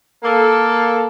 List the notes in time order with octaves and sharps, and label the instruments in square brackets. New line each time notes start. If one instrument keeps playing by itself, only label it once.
[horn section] A#3 A4